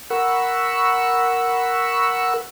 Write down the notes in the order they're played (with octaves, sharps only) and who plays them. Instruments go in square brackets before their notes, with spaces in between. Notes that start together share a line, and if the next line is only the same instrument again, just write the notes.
[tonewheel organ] A#4 F#5 B5 C#6 E6